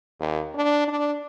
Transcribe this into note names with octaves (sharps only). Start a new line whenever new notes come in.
D#2
D4
D4